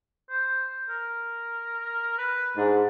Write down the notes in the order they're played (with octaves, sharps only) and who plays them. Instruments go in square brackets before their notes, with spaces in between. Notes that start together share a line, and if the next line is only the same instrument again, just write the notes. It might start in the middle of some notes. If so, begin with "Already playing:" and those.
[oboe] C5
A#4
B4
[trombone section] G#2 [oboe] D4